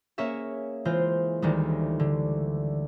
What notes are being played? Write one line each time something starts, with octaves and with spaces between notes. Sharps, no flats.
A#3 C#4 G#4 C#5 E5
E3 G#3 F4 C5
D2 D#3 E3 G3 G#3
D3